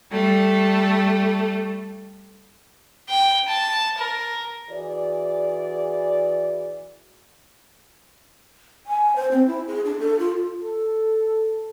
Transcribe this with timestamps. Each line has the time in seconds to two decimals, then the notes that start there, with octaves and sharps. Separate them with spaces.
0.10 G3 A3 A4
3.09 G5
3.49 A5
3.99 A#4
4.70 E3 F#4 G#4 D5
8.86 G#5
9.16 C5
9.31 C4
9.47 E4
9.67 G#4
9.85 D4
10.00 A4
10.19 F4
10.62 A4